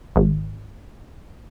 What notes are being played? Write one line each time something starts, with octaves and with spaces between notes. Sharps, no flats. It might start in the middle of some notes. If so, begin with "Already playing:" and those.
G#1